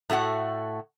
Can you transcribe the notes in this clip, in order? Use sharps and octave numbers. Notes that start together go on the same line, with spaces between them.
A2 A3 F#4 F#5